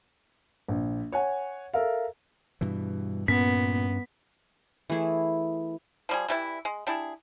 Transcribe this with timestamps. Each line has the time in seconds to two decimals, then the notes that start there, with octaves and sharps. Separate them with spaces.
0.68 A#1
1.12 C#5 F#5 G#5
1.74 A4 A#4 E5 F5
2.61 G2 B2 E3
3.28 G2 A#2 B3 C#4 B6
4.90 E3 A3 E4 G#4
6.09 F3 G3 G#4
6.28 E3 G3 E4
6.65 G#3
6.87 G3 D4 E4 G#4